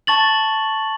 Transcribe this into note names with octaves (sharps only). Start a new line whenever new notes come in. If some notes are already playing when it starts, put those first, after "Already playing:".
A5 C#6 A6 F#7